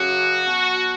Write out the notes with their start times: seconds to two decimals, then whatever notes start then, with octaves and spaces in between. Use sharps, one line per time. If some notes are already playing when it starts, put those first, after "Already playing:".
Already playing: F#2 C#3 F#3 F#4
0.46 B2 F#3